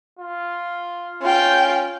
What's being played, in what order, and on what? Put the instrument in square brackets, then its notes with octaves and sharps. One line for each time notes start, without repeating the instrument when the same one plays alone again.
[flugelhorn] F4
[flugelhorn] C#4 [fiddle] F4 G5